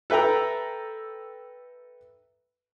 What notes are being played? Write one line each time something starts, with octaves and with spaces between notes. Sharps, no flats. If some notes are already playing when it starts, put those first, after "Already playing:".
A4 B4 E5 G5 A#5